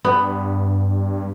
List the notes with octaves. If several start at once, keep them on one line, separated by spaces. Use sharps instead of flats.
G2 B3